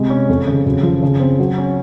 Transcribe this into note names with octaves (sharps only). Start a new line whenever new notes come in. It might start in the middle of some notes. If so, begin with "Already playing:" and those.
Already playing: C3 G#3
C#4
F2
C#3
F#2
F3
C#3
C4
F#3
C#4